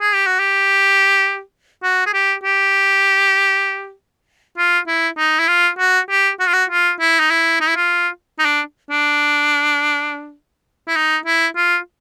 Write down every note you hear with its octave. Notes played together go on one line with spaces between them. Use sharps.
G#4
G4
F#4
G4
F#4
G#4
G4
G4
F4
E4
D#4
E4
F4
F#4
G4
F#4
F4
F#4
F4
E4
D#4
E4
D#4
E4
F4
D#4
D4
D4
E4
D#4
E4
F4